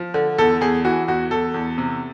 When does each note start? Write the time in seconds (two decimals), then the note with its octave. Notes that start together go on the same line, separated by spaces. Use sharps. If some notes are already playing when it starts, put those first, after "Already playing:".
Already playing: F3
0.14 D3
0.38 E2 A4
0.61 E2 G#4
0.85 E3 F#4
1.08 E2 F#4
1.31 E2 A4
1.54 E2
1.78 C3